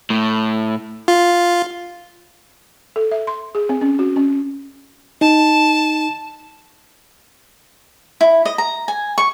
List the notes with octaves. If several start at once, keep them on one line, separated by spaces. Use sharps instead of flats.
A2
F4
A4
E5
C6
G#4
C4
C#4
F#4
C#4
D#4 A5
E4
D#5
A#5
G#5
C#6